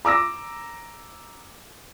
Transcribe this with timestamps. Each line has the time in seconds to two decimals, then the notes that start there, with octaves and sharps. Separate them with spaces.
0.05 A#5 D6 E6 A#6